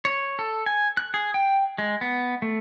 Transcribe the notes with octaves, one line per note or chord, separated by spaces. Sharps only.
C#5
A4
G#5
F#6
G#4
G5
G#3
B3
A3